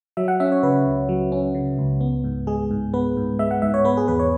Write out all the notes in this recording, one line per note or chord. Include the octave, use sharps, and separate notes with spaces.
F#3 E5
F#5
C#4 E5
C#5
C#3 B4
C#2
F#3
C#4
C#3
C#2
B3
G#2
G#3 G#4
G#2
B3 B4
G#2
G#3 E5
F#5
G#2 E5
C#5
B3 B4
G#4
E2 B4
C#5